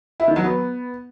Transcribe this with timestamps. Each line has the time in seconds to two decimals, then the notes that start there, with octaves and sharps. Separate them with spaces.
0.20 E4
0.28 D#3
0.36 F#3
0.44 B3